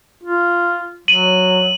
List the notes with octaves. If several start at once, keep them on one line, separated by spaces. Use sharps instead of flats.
F4
F#3 D#7 F#7